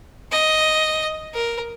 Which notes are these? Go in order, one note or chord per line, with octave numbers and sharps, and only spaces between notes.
D#5
A#4